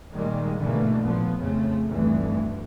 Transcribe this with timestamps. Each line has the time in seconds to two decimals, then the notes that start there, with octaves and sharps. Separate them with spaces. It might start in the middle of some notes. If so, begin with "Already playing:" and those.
0.12 A#2 D#3 G3 G#3 A#3
0.58 G#2 B2 D3 E3 A3 A#3
1.04 A1 A#2 F3 B3
1.39 F2 A2 C#3 A3
1.88 F1 D2 G2 E3